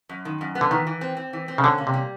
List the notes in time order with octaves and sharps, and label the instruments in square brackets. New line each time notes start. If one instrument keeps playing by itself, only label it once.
[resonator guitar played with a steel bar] F#2
D#3
F#2
B3
[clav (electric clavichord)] D3
[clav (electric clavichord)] D#3 [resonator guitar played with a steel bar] E3
[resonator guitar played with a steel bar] E3
C4
C4
E3
C4
[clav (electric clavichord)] C#3
[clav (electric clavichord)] D3 [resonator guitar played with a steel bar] C#4
[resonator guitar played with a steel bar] A#3
[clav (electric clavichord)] C3
[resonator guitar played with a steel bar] G3